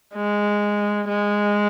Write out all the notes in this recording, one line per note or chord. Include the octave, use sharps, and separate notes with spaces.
G#3
G#3